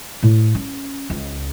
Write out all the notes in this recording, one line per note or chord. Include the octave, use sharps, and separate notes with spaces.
A2
C#4
C#2